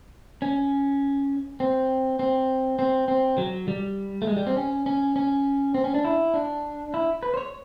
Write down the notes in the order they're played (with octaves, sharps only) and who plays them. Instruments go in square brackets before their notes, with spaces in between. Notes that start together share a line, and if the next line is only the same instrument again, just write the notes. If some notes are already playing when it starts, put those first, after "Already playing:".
[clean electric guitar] C#4
C4
C4
C4
C4
F#3
G3
A3
G#3
G3
C4
C#4
C#4
C#4
C4
C#4
D4
E4
D4
E4
B4
C5
C#5